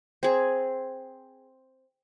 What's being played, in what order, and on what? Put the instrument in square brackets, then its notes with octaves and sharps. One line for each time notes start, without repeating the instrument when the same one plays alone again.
[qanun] C4 G#4